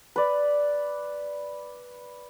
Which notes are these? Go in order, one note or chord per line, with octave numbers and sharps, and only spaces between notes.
B4 D5